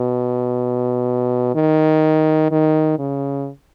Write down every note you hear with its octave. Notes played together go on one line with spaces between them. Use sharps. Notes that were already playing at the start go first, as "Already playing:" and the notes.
Already playing: B2
D#3
D#3
C#3